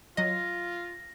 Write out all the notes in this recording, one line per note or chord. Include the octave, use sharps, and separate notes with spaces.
F#3 F4 D#5 A#6